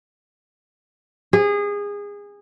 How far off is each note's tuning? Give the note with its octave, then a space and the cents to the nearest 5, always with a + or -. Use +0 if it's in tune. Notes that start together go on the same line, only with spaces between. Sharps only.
G#4 -25